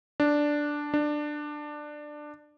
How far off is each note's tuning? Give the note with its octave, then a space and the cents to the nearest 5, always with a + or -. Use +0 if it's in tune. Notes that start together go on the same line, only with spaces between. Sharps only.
D4 +0
D4 +15